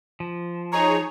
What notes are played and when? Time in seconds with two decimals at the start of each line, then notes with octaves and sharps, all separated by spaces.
0.20 F3
0.72 D#4 G#4 C#5 A#5